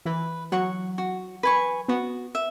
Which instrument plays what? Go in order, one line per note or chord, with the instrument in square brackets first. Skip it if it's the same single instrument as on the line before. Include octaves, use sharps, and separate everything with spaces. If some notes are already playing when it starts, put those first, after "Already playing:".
[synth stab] E3 [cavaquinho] B4
[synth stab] F#3 [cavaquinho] F#5 C#6
[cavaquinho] F#4
B4 G#5 C#6
[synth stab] B3 [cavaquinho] F#4
[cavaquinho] E5